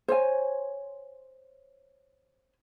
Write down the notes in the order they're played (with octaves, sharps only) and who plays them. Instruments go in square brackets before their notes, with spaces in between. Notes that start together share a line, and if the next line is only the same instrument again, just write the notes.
[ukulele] C5 C#5 G#5